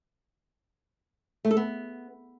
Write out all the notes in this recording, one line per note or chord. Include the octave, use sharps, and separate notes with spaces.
A3
A4
B3